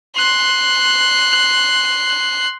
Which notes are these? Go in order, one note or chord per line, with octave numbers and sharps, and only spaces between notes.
C6 F#6